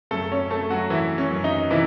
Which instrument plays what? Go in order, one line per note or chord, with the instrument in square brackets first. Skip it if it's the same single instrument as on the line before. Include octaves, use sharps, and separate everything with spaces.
[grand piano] F#2 A3 A4
C#4 C#5
A3 A4
F#3 F#4
E3 E4
C#4
F#2
D#4
C3 E3 E4